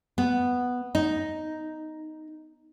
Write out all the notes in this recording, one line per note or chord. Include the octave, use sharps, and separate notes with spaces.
B3
D#4